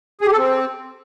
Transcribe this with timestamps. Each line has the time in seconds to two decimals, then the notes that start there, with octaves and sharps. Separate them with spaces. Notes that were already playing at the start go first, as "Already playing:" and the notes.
0.21 G#4
0.27 G4
0.32 A4
0.38 C4